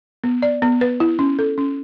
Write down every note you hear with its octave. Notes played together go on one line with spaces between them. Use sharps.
B3
D5
B3
B4
E4
C#4
A4
C#4